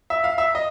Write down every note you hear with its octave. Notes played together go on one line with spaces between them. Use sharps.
E5
F5
E5
D#5